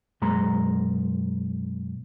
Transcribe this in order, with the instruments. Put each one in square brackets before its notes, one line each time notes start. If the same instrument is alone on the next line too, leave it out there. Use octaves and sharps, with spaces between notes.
[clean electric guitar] F#2 B2 G#3 A#5 C6